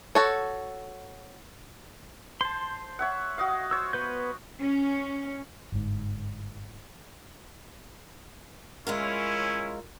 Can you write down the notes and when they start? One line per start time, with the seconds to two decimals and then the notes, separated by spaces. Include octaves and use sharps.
0.15 F#4 A4 C#5
2.41 C5 A5 C6
2.99 C#5 E5 F#5
3.38 F#4 D#5 F5
3.71 C5 C#5 E6
3.93 B3 B4 G6
4.60 C#4
5.72 G1 G#2
8.87 G#3 C#4 E4 F4 A#4